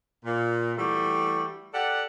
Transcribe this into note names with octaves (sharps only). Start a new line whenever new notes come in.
A#2
E3 G3 A3 D4 F#4 G4
G4 A4 D5 F#5